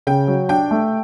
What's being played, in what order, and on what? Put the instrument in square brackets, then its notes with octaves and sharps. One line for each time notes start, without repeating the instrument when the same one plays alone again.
[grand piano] C#3 [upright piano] G5
[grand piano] F#3
[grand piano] D4 [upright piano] G5
[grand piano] A3